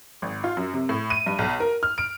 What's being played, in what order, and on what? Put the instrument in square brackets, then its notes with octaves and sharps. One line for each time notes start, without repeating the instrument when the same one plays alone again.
[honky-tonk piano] G#1
F4
F#2
C3
A2
D#7
G2
B1
A#4
F6
D7